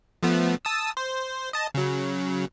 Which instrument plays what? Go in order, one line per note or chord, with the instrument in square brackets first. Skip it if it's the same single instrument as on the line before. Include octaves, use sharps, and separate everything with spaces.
[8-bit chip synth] F3 A3 B3
A5 D#6 E6
C5
D#5 A5
C#3 F#3